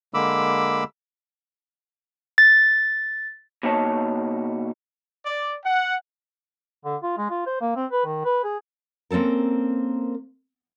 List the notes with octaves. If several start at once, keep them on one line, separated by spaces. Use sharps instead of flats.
D3 G#3 A#3 B5 D6 E6
A6
B2 A#3 D#4 C#5 A5
D5
F#5
D3
F4
G#3
F4
C5
A#3
C4
B4
D#3
B4
G#4
A#3 C4 C#4 A4 A#4